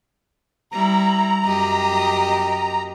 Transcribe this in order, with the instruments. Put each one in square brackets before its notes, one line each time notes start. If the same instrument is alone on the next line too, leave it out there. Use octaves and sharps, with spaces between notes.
[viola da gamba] G3 E4 [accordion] A#5
[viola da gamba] F#2 G4 D#5